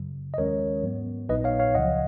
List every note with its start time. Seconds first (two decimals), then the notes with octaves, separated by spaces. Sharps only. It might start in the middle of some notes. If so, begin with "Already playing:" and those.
Already playing: F#2 C#3 F#3
0.34 D#5
0.38 D#2 D#3 G#3 C#4 A#4 C#5
0.83 G#2 F#3 B3
1.29 A#1 A#2 F#3 B3 D#4 B4 D#5
1.44 C#5 F5
1.59 C#5 F5
1.75 C#2 C#3 F3 D#5 F#5